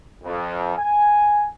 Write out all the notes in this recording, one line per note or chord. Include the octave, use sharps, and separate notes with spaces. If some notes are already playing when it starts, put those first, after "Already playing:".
F2
G#5